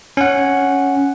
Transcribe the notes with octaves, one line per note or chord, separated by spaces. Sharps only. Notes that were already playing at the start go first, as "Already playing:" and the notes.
C#4 F#5